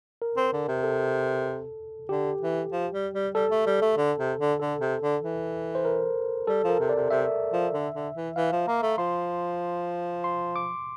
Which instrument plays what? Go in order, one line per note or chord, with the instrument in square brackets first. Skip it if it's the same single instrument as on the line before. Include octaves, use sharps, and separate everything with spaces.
[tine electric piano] A#4
[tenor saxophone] C4
D3
C3
[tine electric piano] A4
[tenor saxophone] D3 [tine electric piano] G4
[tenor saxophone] E3
F3
G3
G3
[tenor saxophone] G3 [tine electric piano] A4
[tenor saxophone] A3
G3
A3
D3
C3
D3
[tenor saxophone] D3 [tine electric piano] A4
[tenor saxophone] C3
D3
E3
[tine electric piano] C5
A#4
[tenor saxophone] G3 [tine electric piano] A4
[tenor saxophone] F3 [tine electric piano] A#4
[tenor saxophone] C3
[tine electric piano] D5
[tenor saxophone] C3
[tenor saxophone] C3 [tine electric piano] E5
[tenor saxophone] F3
D3
D3
E3
[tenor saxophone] E3 [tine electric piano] F5
[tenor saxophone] F3
[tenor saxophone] A#3 [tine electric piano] A#5
[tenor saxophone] A3
[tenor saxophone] F3 [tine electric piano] C6
[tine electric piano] C6
D6